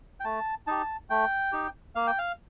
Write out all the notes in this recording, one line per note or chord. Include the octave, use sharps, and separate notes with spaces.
G5
A3 A5
D#4 G4 A5
A3 G5
D#4 G4
A#3 F5
G5
F5